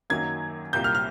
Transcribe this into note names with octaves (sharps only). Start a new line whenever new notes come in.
F#2 D#3 F#3 A#3 G#6
C2 A#2 G3 A#3 G6
F6
F6